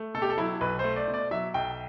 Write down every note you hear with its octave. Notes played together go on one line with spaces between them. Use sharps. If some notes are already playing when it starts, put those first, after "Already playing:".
Already playing: A3
B2 A4
G4
A4
F#3 E4
B1 B4
A3 C5
D5
B2
D5
F#3 E5
B1 G5